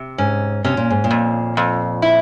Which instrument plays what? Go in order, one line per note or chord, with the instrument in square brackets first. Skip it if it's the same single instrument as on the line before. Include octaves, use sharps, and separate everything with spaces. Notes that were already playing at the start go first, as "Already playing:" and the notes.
Already playing: [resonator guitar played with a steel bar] C3
[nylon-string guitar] G#2 [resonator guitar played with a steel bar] C#4
[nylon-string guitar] C3 [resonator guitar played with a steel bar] C#4
[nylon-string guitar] A#2
G#2
A#2
[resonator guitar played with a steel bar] F2
F2
E4